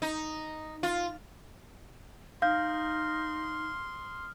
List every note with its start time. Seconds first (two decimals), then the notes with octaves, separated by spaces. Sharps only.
0.02 D#4
0.83 F4
2.42 D#4 F5 C6 D#6 F6 G6